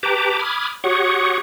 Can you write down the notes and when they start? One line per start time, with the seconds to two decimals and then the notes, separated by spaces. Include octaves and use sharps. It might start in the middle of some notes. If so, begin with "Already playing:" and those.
0.03 G4 B4 G5 A5 A#5 D6
0.39 B5 D6 D#6 F6 G#6
0.84 F#4 G4 C#5 F#5 C#6 D#6